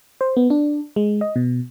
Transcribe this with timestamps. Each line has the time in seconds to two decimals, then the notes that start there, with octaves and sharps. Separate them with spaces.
0.21 C5
0.37 B3
0.50 D4
0.96 G#3
1.21 D#5
1.36 B2